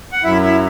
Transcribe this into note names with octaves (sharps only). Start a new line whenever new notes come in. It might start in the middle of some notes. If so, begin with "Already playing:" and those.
F#5
F#2 F#3 E4 E5
E4 E5